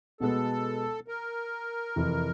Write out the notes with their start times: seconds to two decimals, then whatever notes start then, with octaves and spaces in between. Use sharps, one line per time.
0.20 B2 G#3 B3 A4
1.08 A#4
1.96 F2 C3 E3